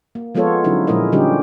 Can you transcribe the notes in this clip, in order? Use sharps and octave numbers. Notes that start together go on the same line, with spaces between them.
A#3
F3 G#3 B3 F4 A4 C#5
D3 F#3 C#4 D#4 E4
A#2 F3 G#3 E4 A#4 D#5
D3 G3 C#4 D#4 G4